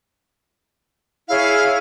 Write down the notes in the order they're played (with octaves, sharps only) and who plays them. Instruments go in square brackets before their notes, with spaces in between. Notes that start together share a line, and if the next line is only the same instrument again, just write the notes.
[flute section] E4 G#4 C#5 [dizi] F5